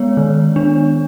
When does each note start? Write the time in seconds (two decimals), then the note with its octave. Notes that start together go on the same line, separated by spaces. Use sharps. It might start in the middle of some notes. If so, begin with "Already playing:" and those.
Already playing: G#3 B3 C#5
0.17 D#3
0.56 D4